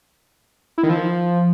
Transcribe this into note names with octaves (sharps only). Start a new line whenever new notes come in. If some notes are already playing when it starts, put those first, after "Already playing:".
E4
D#3
F3